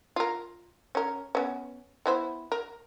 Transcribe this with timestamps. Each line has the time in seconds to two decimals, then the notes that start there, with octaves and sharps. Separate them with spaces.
0.16 F4 A#4
0.95 C#4 A#4
1.35 B3 C#4
2.06 B3 E4 C5
2.52 A#4